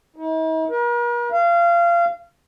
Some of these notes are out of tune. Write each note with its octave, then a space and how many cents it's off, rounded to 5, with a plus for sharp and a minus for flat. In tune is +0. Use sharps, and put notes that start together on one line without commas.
D#4 +45
A#4 +45
F5 -25